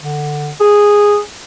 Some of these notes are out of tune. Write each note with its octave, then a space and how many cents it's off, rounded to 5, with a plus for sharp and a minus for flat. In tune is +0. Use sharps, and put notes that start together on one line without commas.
D3 +15
G#4 -10